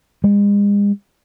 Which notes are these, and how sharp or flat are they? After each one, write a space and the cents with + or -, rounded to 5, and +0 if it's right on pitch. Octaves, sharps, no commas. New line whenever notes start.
G#3 -40